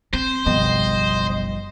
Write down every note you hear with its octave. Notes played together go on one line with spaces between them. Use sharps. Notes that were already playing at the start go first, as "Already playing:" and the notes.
C4 C5
F#1 B1 F3 G3 B3 D#5